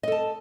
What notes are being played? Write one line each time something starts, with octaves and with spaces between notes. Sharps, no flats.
A4 D#5 A5